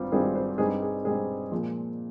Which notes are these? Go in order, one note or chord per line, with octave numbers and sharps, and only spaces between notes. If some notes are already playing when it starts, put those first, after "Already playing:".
Already playing: G#1 G2 G3 C4 F4
G#1 G2 G3 C4 F4 G#4
C5
G2 G3 C4 D#4 G#4
G#4
G2 G3 C4 D#4 G#4
A#2 F3 G#3